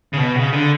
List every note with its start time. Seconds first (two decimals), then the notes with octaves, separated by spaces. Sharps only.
0.13 C#3
0.18 B2
0.36 C#3
0.53 D3